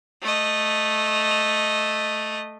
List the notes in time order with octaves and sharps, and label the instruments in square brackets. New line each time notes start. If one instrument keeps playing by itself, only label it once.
[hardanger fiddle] A3 D#5